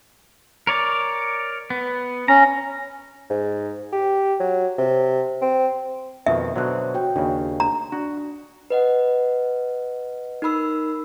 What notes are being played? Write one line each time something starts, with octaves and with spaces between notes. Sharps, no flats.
A#4 C#5 D5
B3
C#4 A#5
G#2
G4
F#3
C3
C4
F2 B2 D#3 E5
B2 D3 F#3 C5 F#6
F#4 C#5 G5
D#2 C#3 D4
A#5
D4 F#4
B4 D#5 F#5
D#4 A#4 B5 E6